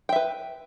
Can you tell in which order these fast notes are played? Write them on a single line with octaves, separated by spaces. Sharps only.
G5 E5 B4